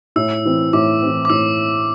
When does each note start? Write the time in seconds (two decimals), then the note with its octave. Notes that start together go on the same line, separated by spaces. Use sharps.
0.16 A2 E6
0.45 E3 C4
0.73 A2 D6
1.02 E3 C4
1.25 D6
1.30 A2 E6